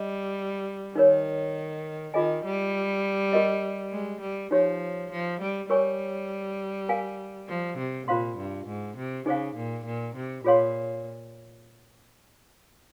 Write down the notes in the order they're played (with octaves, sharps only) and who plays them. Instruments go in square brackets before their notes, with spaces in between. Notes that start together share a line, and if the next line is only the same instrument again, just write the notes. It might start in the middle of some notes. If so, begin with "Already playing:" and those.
Already playing: [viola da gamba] G3 [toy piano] D#5
[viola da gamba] D#3 [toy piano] D#4 A#4 C#5
[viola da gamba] D#3 [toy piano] F4 G#4 D#5 G#5
[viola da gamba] G3
[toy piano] G4 A#4 D#5
[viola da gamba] G#3
G3
[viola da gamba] F3 [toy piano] D#4 G4 C#5
[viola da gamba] F3
G3
[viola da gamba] G3 [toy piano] A#4 C#5 G#5 C#6
[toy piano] A#4 F5 G#5
[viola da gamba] F3
C3
[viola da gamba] A#2 [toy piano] F4 C5 F5 C6
[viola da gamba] G2
G#2
C3
[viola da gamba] C#3 [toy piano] D#4 G#4 C5 F5
[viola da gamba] A#2
A#2
C3
[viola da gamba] A#2 [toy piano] F4 G#4 C#5 F5 C6